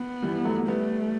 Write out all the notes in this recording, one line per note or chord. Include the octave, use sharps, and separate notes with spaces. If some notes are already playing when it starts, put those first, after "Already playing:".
Already playing: B3
E3 G3
F#3 A3
G3 A3 B3